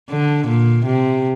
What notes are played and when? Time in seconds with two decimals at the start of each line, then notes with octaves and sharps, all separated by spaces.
0.10 D3
0.48 A#2
0.86 C3